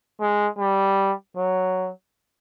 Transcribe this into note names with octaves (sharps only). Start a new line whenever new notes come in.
G#3
G3
F#3